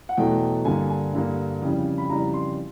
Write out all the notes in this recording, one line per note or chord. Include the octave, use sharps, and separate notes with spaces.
F#5
E2 B2 F#3 A3 G5
G2 D3 G3 A#3 G#5
G#5
G2 D3 G3 A#3
F2 C#3 E3 G3
B5
F2 C#3 E3 G3 A#5
C6